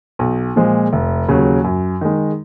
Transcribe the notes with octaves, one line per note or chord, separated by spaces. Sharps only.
B1
A#2 F3 G#3
F1
D#2 C#3 F#3
F#2
D#3 G#3